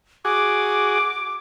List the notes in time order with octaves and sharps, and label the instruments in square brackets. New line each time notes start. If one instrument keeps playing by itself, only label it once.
[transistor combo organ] F#4 G#4 [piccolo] D6